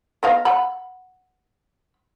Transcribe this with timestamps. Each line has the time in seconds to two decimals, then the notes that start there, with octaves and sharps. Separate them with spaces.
0.23 B3 D#5 F5
0.45 F#5 B5